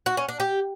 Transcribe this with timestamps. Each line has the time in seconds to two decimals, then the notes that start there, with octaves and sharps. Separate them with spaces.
0.06 F#4
0.17 C#4
0.29 D4
0.40 G4